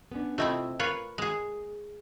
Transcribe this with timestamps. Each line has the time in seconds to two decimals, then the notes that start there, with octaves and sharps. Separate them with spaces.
0.12 B3 C#4 D4
0.38 C3 A3 C4 E4 F4 D#5
0.79 F4 A#4 B4 C#5
1.18 G#3 G#4